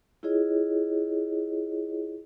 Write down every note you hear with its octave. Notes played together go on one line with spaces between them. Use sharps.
E4 F4 G#4 C#5 D#5